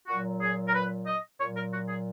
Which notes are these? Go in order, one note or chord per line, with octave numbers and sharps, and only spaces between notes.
A#2 F#3 F#4
G#4
A#4
B4
D#5
A#2 F#3 C#5
A#4
F#4
G#4